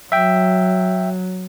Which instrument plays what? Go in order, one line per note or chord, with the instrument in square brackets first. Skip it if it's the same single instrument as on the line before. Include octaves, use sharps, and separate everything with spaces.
[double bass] F#3 [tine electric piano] E5 G5